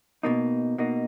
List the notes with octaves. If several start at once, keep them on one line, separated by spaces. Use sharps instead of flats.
B2 A#3 D#4
B2 A#3 D#4